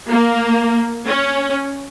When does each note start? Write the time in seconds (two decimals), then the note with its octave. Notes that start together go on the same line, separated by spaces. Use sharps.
0.09 A#3
1.07 C#4